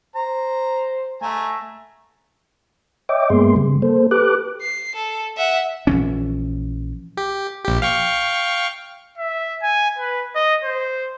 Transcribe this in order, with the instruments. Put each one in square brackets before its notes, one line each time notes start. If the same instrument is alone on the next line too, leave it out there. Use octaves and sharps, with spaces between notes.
[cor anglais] C5 [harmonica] A#5
[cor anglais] A3 [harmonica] G#5 A#5
[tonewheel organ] C#5 D#5 E5 G5 D6
G2 G#3 A#3 B3 G#4 C6
C#3 G3
A#3 A4 C5
G4 A4 B4 D6 F#6
[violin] C7
A4
E5 F#5
[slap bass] A#1 E3 C#4
[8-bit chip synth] G4
A#1 G4
F5 G5 C#6
[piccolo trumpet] E5
G#5
B4
D#5
C5